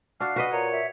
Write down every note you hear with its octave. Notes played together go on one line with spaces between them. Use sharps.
D4 F#4 F5
F#4 B4 D#5
A#2 C#5 A#5
E5